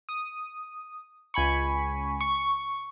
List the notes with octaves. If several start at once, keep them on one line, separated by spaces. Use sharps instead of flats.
D#6
C#2 G#5 B5 C#6
C#6